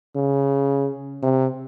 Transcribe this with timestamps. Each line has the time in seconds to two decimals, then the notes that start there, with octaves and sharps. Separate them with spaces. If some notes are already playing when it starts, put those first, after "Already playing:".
0.16 C#3
1.23 C3